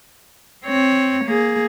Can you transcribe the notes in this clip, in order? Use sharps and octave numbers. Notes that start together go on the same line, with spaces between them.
C4 C#5
A#3 G#4